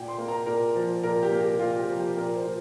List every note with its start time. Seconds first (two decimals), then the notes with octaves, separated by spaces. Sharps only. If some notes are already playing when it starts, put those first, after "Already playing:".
Already playing: A#2 G5
0.08 C6
0.18 A#3
0.28 A#5
0.46 A#2 A#4
0.75 F3
1.03 A#2 A#4
1.23 G4
1.31 A#3
1.40 G4
1.59 A#2 F4
1.79 G4
1.88 F3
1.98 G4
2.17 A#2 A#4
2.36 C5
2.44 A#2